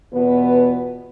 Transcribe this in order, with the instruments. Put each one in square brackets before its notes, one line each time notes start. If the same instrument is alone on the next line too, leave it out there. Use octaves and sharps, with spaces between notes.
[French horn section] E2 B2 B3 F4 B4